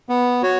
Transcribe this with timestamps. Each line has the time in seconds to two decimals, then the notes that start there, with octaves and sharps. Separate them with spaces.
0.09 B3
0.42 F#4 C#5